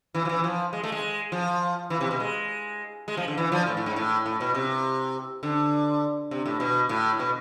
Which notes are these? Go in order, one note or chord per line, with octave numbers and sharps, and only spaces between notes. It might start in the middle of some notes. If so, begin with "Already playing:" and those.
E3
F3
E3
F3
G#3
A3
G#3
F3
E3
C3
B2
G#3
G#3
F3
D3
E3
F3
A2
A2
G#2
A2
A2
B2
C3
D3
C3
A2
B2
A2
B2